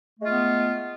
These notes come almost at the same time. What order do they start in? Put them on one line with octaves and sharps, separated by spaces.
A3 G#3 F4 B3